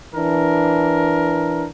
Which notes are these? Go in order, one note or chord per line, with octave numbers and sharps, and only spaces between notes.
E3 D4 A#4